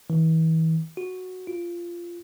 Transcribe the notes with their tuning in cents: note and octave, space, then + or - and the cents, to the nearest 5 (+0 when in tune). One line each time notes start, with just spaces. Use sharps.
E3 -40
F#4 -5
F4 -15